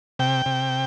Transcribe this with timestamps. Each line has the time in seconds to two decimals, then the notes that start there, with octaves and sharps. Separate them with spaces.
0.19 C3 G5
0.46 C3